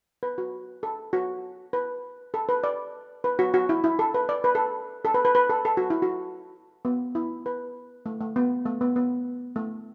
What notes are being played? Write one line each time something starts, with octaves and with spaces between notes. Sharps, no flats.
B4
F#4
A4
F#4
B4
A4
B4
D5
B4
F#4
F#4
E4
E4
A4
B4
D5
B4
A4
A4
B4
B4
B4
A4
A4
F#4
E4
F#4
B3
E4
B4
A3
A3
B3
A3
B3
B3
A3